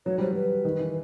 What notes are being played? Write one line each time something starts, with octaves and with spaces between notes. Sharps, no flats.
F#3 C#5
G3 C5
F#3 B4
D#3
E3